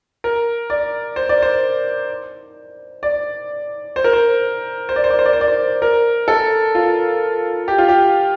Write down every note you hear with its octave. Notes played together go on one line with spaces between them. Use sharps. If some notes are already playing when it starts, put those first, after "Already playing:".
A#4
D5
C5
D5
C5
D5
C5
A#4
C5
C5
D5
C5
D5
C5
D5
C5
D5
C5
A#4
A4
F4
G4
F4
G4